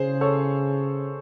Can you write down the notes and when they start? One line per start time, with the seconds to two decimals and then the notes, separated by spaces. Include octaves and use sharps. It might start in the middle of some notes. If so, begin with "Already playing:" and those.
Already playing: C#3 G#4 C5
0.21 A4 C#5